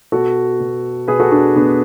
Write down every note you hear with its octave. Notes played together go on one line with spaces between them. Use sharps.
B2 F#4 A4
B2
B2 G#4 B4
F#4 A4
D4 F#4
B2 B3 D4